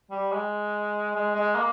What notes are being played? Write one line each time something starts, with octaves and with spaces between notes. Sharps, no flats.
G3
G#3
G#3
G#3
A#3